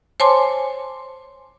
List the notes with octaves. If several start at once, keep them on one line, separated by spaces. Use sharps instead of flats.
C5 C#5 G#5 A5 C6 D6